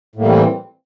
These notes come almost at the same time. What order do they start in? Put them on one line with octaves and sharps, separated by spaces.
A2 A#3 G3 E3 C4